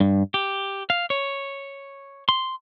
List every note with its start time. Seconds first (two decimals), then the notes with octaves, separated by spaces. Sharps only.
0.01 G2
0.34 G4
0.90 F5
1.10 C#5
2.29 C6